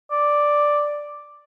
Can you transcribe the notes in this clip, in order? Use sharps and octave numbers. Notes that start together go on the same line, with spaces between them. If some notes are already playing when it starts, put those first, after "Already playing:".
D5